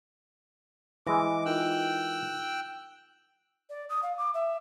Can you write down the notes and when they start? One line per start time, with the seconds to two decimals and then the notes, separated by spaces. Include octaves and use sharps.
1.07 E3 G#3 G#5 D6 A#6
1.46 D#4 F4 A#4 G5 E6 F#6
3.70 D5
3.89 D#6
4.03 F5
4.18 D6
4.34 E5